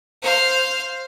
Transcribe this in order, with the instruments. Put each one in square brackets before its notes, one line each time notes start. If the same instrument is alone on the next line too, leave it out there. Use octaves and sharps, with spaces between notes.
[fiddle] C5 F5